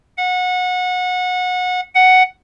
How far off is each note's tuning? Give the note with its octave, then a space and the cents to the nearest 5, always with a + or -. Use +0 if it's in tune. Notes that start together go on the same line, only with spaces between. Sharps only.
F#5 -25
F#5 +5